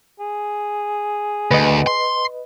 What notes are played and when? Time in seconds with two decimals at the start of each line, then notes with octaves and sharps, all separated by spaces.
0.20 G#4
1.51 D2 B4 D#5
1.87 C6